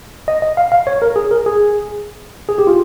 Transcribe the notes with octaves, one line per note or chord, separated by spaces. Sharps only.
D#5
D#5
F5
F5
C#5
A#4
G#4
A#4
G#4
G#4
G4
F4